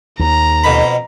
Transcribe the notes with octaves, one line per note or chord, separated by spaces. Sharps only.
D#2 A#5
F2 B2 B5